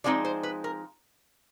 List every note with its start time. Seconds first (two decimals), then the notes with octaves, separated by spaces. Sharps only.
0.04 F3 G#3 C4 D#4 D5
0.25 C5
0.43 B4
0.64 A#4